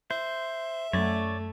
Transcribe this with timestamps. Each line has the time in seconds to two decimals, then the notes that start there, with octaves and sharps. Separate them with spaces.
0.11 C5 E5
0.93 F#2 A3 C#5 D5